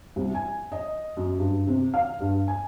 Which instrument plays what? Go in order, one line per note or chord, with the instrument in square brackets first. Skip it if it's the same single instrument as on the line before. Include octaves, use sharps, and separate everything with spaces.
[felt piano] C2
G#5
D#5
F#2
G2
C3
F5
G2
G#5